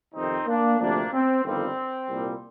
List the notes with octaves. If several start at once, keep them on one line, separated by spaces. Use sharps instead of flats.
F2 C3 D#3 C4 D#4
A#3 D4
D2 C3 F3 A#3 D4
C4
G1 F2 D#3 G3 C4
C2 A#2 G3